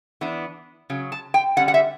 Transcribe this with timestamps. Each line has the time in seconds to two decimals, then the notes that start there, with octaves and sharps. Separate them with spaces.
0.21 E3 B3 D4
0.90 C#3 F#3
1.12 A5
1.34 G5
1.57 D3 G3 C#4 F#5
1.68 F#5
1.74 E5